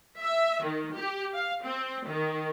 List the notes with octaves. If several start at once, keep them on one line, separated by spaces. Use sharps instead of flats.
E5
D#3
G4
F5
C4
D#3